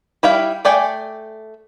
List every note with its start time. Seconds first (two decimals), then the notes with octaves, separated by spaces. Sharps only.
0.23 G3 E4 F5 G5
0.65 A3 D5 G5 G#5